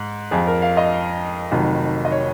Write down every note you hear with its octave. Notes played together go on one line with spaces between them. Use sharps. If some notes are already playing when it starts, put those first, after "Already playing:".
Already playing: G#2
F2 F3 G#4
A#4
F5
D#5
F1 F2 D#3 F#3
D#5
C#5